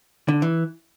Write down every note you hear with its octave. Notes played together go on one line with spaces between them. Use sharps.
D3
E3